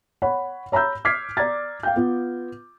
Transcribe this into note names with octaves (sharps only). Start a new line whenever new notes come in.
C#5 F#5 B5
C#5 A#5 B5 E6 G6
D6 F6 G#6 B6 C7
D5 A#5 G#6 A6
F5 G5 G6
B3 F4